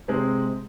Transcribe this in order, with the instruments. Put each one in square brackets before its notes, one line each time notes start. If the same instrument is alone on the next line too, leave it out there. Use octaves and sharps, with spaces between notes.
[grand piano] C3 G#3 C4